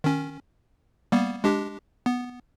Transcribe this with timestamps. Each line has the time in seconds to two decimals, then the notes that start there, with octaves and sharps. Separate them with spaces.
0.04 D#3 C#4
1.12 G3 A#3 B3
1.44 G#3 D4 G4
2.06 B3